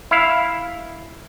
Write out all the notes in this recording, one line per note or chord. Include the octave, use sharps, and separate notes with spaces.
E4 F5